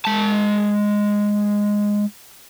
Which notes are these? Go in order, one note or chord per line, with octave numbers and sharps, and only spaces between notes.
G#3 A5